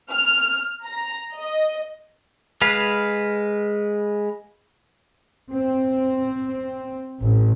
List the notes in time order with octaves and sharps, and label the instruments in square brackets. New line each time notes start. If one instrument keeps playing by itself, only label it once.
[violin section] F6
A#5
D#5
[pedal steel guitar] G#3 B4 F5
[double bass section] C4
A1